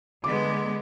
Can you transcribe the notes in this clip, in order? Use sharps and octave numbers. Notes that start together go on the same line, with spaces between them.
D3 G#3 B3 D6